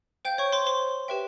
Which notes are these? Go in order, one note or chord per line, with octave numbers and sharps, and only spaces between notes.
C5 F5 G5 G6
C#5 C#6
C5 C6
C5 C6
G4 B4 E5 G5